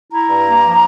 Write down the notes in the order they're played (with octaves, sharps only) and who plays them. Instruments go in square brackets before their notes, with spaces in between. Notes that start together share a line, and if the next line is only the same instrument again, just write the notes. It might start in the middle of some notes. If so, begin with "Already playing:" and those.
[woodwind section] E4 A#5
G2
A#3
F3